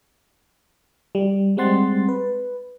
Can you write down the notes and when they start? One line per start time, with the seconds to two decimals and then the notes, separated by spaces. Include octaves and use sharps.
1.15 G3
1.57 G3 G#3 C4 F#5 C6 A6
2.09 B4